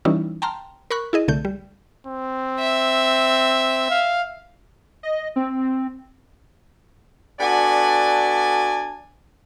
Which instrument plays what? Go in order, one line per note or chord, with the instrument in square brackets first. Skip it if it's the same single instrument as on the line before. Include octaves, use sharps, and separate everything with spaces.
[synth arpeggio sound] E3 G3 C#4 D#4 E4
G5 A5 A#5 C6 F6
A#4 B5 C#6 F#6
E4 G#4 D#5
C2 D3 A3 G6
G3
[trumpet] C4
[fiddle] E5
[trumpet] F5
[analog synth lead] D#5
C4
[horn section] B3 D4 F#4 A4 D5 G#5